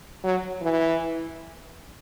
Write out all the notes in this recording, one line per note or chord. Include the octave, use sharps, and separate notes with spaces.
F#3
E3